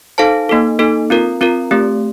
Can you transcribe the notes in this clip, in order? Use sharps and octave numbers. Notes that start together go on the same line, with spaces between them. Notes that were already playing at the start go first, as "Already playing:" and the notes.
D#4 A4 C5 F5 A5
A#3 D#4 A4
A#3 D#4 A4
C4 F4 A#4
C4 F4 A#4
A3 C4 G4